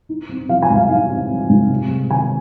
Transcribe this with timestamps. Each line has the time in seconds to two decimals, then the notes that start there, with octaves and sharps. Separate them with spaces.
0.09 D#4
0.29 C4
0.49 F3 F5
0.62 G#5
0.70 G#2
0.76 F5
0.90 D#4 F5
1.10 C4
1.30 F3
1.50 G#2
1.70 C3
1.90 G#3
2.10 D#3 G#5